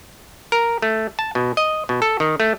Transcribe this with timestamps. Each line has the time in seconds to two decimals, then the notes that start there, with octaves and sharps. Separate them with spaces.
0.52 A#4
0.82 A3
1.19 A5
1.35 B2
1.57 D#5
1.89 B2
2.02 A4
2.20 D#3
2.40 A3